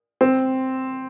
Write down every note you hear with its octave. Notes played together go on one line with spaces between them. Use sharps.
C4